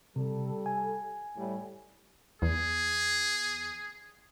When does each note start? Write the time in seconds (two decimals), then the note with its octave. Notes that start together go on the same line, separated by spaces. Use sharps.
0.16 C3 G3 A4
0.66 G#5
1.36 A2 G3
2.42 E2 G#4